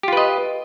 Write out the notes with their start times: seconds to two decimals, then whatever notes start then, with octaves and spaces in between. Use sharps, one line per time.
0.03 G4
0.08 F4
0.13 B4
0.17 D#5